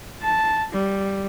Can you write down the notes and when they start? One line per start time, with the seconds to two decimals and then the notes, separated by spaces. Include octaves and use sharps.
0.22 A5
0.73 G3